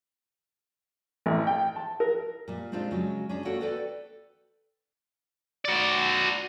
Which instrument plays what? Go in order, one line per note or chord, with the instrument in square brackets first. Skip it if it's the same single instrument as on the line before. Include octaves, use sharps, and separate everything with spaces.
[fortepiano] A1
G5
A5
A#4
[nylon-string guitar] A#2 G3
G3 G#3 C4 D4 D#4 F4
C#3 F#3 G#3
C#4 D4 G#4
A#3 F#4 A4 C#5 F#5 G5
A4 B4 D5 G5
[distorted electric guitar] F#4 D5